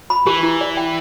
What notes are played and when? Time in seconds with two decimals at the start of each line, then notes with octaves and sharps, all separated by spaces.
0.10 B5
0.27 E3 G4
0.43 E4
0.61 D5
0.77 G5